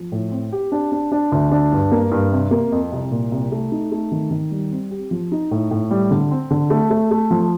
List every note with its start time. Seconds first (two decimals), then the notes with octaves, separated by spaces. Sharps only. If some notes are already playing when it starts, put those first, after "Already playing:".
Already playing: F3
0.12 A2
0.31 C4
0.52 G4
0.72 D4
0.92 D4
1.12 D4
1.32 D2
1.51 D4
1.72 G2
1.92 A#3
2.11 G2
2.32 C3
2.51 A#3
2.72 F2
2.92 C2
3.11 A#2
3.32 C2
3.52 A3
3.72 D#4
3.92 A3
4.12 D#3
4.31 D#3
4.51 G3
4.71 C4
4.91 G4
5.11 F3
5.32 D#4
5.51 A2
5.71 A2
5.91 G3
6.11 D3
6.31 C4
6.51 D3
6.70 A3
6.90 A3
7.11 A3
7.31 F3